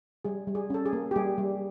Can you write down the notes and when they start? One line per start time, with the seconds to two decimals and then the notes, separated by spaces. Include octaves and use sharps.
0.25 G3 G#4
0.47 G3
0.55 G#4
0.70 C#4 A4
0.86 G#4
0.93 A#3
1.11 G4
1.16 G3 G#4
1.38 G3